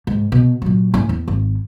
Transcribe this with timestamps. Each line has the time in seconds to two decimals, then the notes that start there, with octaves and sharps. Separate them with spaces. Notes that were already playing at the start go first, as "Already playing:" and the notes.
0.07 G#2
0.32 B2
0.62 A#2 F#3
0.94 A2 C#4
1.09 E2
1.28 G#1